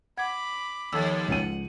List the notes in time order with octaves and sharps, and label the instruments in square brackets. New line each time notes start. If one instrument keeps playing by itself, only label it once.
[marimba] F#5 G#6 [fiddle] B5 D6
[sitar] D#2 [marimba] F3 A4 E6
[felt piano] C#2 D#7 [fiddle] F#5